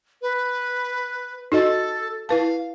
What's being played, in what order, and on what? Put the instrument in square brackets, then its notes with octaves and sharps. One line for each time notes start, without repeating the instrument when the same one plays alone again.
[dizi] B4
[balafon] D#4 F#4 D#5 [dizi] A4
[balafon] E4 B4 A5 [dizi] F5